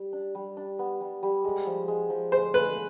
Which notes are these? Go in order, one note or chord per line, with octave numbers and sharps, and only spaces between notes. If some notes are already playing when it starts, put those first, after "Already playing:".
Already playing: G3
D4
G3
D4
B3
G3
G3
G#3
F3
G#3
F3
G#3 C5
G#3 B4